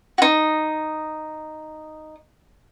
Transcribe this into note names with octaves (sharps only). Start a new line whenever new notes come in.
D#4 F#4